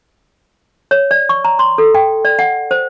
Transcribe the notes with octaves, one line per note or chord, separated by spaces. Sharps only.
C#5
D5
C#6
A#5
C6
A4
G5
D5
F#5
C5